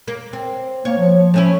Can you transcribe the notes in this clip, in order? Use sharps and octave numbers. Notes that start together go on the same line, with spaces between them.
A#3
C4
A#3 C#5
F3
A3 C#4 E4